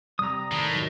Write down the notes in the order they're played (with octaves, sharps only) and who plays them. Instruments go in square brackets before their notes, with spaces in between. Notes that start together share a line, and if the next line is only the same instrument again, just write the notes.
[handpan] C3 G3 [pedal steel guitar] A#5 D#6
[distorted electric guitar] A2 [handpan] D#3
[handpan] D#3 F#3